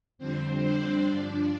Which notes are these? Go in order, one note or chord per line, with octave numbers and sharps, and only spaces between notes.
F2 D3 G3 C4 C5
D4 D5
G2 F3